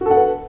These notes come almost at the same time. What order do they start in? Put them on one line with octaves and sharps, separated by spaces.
F#4 A4 F#5 B4